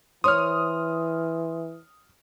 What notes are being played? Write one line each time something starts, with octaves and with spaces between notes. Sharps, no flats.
E3 C5 C#5 C6 D#6 F6